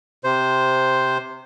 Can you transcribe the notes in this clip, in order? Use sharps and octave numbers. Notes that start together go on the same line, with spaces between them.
C3 C5